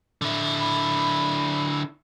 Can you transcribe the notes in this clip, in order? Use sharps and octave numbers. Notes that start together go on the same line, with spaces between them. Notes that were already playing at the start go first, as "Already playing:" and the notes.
D3 E4
B5